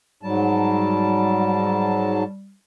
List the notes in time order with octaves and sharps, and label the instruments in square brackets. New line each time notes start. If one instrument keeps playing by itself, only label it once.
[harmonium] G#2 F#3 A5 [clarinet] G3